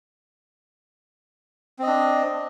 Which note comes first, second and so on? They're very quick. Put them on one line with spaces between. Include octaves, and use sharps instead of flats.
C4 D#5 D4